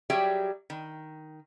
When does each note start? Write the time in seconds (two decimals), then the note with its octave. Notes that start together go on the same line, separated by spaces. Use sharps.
0.10 F#3 G3 G4 G#4 E5 G5
0.70 D#3